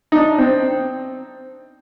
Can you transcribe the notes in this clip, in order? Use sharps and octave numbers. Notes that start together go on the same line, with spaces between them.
D#4
D4
C4